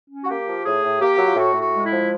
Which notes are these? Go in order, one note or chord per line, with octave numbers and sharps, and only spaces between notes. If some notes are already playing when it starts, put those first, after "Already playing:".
C#4
F#4
A#3 G4
F3
A2 G#4
A2
A#3 G4
F#3
F4
A2 F#4
A2
F#4
G#3
E4
F3